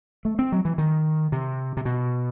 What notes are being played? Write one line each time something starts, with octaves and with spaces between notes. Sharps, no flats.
A3
C4
F#3
E3
D#3
C3
C3
B2